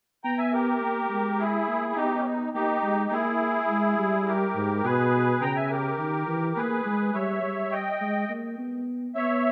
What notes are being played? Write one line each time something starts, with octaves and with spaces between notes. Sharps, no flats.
B3 G5 A#5
E5 G#5
G4 A#4
A#3
G#3
E4 G#4
A#3
E4
B3 D#4 G4
C#4
D#4
A#3 D#4 G4
G#3
A#3 E4 G#4
G#3
G3
G4 A#4
G#2
B2 G#4 B4
C#3 G5 A#5
E5 G#5
G4 A#4
D#3
E3
A#3 G#4 B4
G#3
G3 C#5 E5
G3
D#5 G5
G#3
A#3
B3
B3 C#5 E5